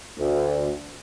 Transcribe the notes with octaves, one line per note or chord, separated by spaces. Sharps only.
D2